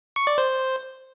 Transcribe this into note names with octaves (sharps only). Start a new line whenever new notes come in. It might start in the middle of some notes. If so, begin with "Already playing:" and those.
C#6
D5
C5